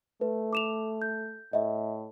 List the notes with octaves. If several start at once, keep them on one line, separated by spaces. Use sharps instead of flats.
A3 B4
D6 E7 F7
G6
A2 D#5 E5